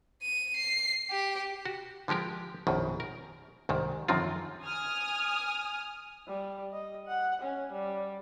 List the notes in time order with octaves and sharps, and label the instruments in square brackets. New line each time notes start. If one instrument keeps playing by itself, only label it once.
[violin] D#7
C7
G4
[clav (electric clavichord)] F#4
D3 F3 G#3 G4 A#4
A#1 F#2 B2 D#3
A#4
C2 G#2 D#3
F#2 D3 D#3 F3 C4 F4
[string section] G#5 D#6 F6
[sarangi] G3
D#5
F#5
C#4
G3